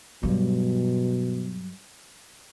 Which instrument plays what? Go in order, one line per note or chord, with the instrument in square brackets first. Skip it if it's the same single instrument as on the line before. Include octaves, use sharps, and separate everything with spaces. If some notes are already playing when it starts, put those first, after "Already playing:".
[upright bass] G2 F#3 [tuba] B2